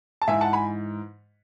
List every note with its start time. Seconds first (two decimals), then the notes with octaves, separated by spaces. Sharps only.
0.22 A5
0.28 G#2 E3 E5 G#5
0.41 F#5 A5
0.53 G#5 B5